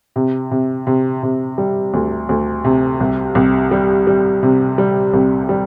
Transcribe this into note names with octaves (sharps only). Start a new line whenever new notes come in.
C3
C3
C3
C3
G3
D2
D2
C3
C2
C2
G3
G3
C3
G3
C2
G3